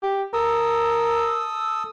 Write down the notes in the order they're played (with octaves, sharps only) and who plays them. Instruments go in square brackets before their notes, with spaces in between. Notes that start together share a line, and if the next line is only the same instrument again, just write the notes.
[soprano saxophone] G4
[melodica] A4 D#6 E6 [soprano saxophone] A#4